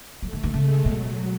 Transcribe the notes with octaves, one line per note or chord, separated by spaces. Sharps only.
F#3 A3
D#3
D#3
C#3 G#3
B2 F#3